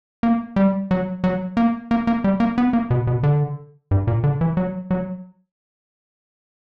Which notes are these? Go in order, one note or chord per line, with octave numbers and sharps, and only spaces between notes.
A#3
G3
F#3
F#3
A#3
A#3
A#3
G3
A#3
B3
A#3
B2
B2
D3
G2
A#2
D3
E3
F#3
F#3